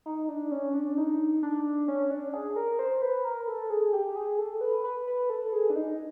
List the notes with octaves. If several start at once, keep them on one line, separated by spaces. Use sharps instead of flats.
D#4
D4
C#4
D4
D#4
D4
C#4
D4
G#4
A#4
C5
B4
A#4
A4
G#4
G4
G#4
A4
B4
B4
B4
A4
G#4
D4
D#4